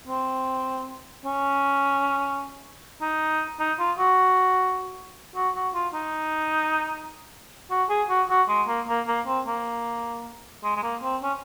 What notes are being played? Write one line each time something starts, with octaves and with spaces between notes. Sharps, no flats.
C4
C#4
D#4
D#4
F4
F#4
F#4
F#4
F4
D#4
F#4
G#4
F#4
F#4
G#3
A#3
A#3
A#3
C4
A#3
G#3
G#3
A#3
C4
C#4